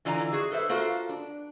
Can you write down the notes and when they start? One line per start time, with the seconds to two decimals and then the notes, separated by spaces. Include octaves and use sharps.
0.05 D3 E3 F4 D5 G#5 A#5
0.33 F#4 G#4
0.52 A4 B4 C5 E5
0.69 A#3 F4 F#4 A4 C5
1.09 D4